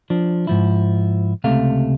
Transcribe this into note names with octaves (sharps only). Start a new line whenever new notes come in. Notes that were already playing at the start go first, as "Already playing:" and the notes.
F3 D4
G#2 F3 E4
C#2 C3 A3 F5